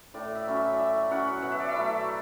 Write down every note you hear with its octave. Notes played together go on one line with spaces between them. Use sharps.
A2 D5
E5
F#3 C#4 E4
E5
D5
A2 E5
F#3 C#4 E4 F#5
B2 F#5
E5
D5
E5
F#3 A3 E4